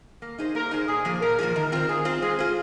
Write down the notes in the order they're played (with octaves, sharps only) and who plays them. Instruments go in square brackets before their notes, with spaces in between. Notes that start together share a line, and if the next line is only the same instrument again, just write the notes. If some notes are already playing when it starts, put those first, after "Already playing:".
[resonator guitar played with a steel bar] A#3
D#4 G#4 C5
[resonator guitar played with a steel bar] A#3 [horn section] A#4
[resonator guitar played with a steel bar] D#4 G#4 C5
[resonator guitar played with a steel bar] A#2 [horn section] G#4
[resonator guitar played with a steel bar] F3 A#3 F4 G#4
[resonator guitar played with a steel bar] A#2 [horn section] A#4
[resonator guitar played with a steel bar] F3 A#3 F4 G#4
[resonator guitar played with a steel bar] D#3 [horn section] A#4
[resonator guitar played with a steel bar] C4 F4 C5
[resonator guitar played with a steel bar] D#3 [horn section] G#4
[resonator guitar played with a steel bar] C4 F4 C5
[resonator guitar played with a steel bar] G#3 [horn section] G#4
[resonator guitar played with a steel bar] F4 G#4 C5